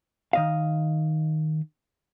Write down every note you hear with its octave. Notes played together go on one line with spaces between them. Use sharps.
D#3 D#5 F5